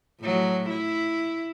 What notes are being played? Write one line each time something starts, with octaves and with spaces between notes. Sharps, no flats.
A2 F#3
E4